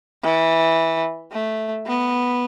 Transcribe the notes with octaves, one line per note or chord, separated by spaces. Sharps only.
E3
A3
B3